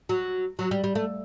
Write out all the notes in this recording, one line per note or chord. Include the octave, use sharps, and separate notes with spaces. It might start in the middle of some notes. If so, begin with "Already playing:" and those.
F#3
F#3
G3
G3
A3